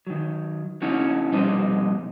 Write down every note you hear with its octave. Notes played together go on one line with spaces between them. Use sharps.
D#3 F#3
C#3 C#4 D#4 E4 F#4
F2 B2 G3 D#4 C5